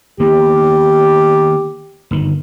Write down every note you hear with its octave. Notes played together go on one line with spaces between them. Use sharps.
D#3 A#3 B3 G4
G1 D#3